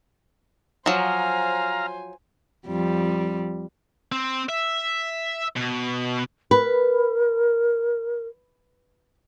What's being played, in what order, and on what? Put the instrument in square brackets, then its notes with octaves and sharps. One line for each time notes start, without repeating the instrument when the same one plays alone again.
[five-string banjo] F3 F#3 [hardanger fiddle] C5 G#5 [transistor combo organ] F5 A#5
[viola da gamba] F2 G3
[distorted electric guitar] C4
E5
B2
[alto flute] A#4 [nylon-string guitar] B4